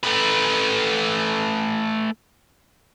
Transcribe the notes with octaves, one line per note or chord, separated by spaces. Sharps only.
A3 B4